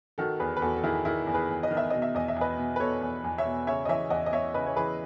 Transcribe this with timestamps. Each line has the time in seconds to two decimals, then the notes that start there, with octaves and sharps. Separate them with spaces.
0.18 D#3 F#4 A4
0.40 E2 G#4 B4
0.56 B4
0.61 E2 F#4 A4
0.77 A4
0.83 D#3 E4 G#4
1.05 D#3 E4 G#4
1.27 E2
1.34 G#4 B4
1.49 E2
1.63 D#5
1.71 D#3
1.77 E5
1.90 B2 D#5
2.02 E5
2.14 E2 D#5
2.28 E5
2.36 E2 B4 D#5
2.58 B2
2.76 B4
2.80 B2 A4 C#5
3.01 E2
3.24 E2
3.38 C#5 E5
3.45 B2
3.67 C#3 C#5 E5
3.85 D#5
3.89 E3 C#5 E5
4.10 E2 D#5 F#5
4.26 D#5
4.32 E2 C#5 E5
4.54 C#3 B4 D#5
4.66 C#5
4.76 E3 G#4 B4